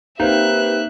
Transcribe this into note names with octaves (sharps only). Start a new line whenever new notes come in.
A#3 C4 D#4 G4 B4 E5 F#6